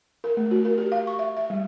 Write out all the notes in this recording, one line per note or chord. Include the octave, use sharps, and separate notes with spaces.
A#4
A3
F#4
A#4
G4
F5
C#6
E5
E5
G3